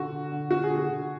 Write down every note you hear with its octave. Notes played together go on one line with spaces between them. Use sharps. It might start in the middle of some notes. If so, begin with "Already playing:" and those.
Already playing: D3 F#4
D3
D3
D3 F#4
G#4
D3
F#4
D3